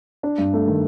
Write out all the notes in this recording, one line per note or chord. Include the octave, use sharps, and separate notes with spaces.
D4
G2
A3
D#3